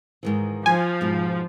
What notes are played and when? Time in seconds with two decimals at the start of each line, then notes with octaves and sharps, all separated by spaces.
0.23 G#2 D#3 E3
0.66 F3 G#5
1.01 G#2 B2